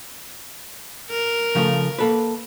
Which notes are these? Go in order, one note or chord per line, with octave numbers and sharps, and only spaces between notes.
A#4
C#3 F3 A3
A#3 A4 B4